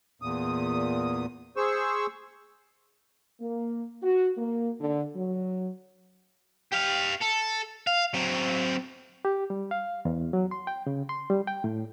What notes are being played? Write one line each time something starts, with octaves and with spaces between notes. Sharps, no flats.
E2 A#2 D#6
G#4 C5 C#6 E6
A#3
F#4
A#3
D3
F#3
G4 F5
A4
F5
F#3 C4
G4
G3
F5
E2
F#3
C6
G5
C#3
C6
G3
G5
A2